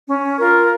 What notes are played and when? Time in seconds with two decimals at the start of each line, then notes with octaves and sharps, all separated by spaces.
0.08 C#4
0.39 F4 A#4